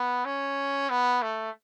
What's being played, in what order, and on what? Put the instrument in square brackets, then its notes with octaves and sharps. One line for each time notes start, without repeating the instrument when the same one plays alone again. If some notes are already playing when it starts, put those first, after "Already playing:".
Already playing: [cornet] B3
C#4
B3
A3